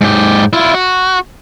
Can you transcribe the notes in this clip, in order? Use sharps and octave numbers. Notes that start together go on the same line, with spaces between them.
G#2 G4
E4 F4
F#4